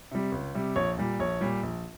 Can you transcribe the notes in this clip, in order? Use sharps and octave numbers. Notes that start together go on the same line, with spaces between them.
C3 G3
C#2
C3 G3
A#1 C#5
A#2 G3
A#1 C#5
A#2 G3
A#1